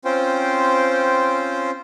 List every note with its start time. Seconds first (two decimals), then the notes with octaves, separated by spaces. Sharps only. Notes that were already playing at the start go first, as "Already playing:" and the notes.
0.05 C4 C#4 F4 C5 G5